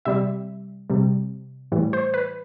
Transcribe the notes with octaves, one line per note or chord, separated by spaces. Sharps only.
C3 G3 E5
C3 G3
A2 E3 G3
C5
B4